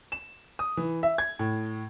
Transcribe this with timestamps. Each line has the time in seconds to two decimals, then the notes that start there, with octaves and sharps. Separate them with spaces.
0.12 E7
0.59 D#6
0.77 E3
1.03 E5
1.18 G#6
1.39 A2